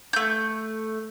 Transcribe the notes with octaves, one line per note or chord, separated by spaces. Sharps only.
A3 G6